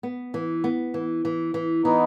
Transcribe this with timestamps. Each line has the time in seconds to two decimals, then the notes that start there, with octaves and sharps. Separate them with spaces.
0.03 B3
0.34 E3
0.64 B3
0.94 E3
1.25 E3
1.54 E3
1.85 E3 B3 D#4